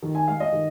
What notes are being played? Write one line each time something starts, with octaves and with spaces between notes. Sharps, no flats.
D#3
G#5
G#3 F5
D#5
D#3